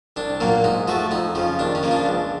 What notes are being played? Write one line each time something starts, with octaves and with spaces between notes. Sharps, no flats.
C2 D4
A#2 F#3 A#3
G#2 D#4
F3 A3 F#4
F2 D#4
C#3 F3
D#2 D4
C#4
C#3 F3 A#3
D4
C#2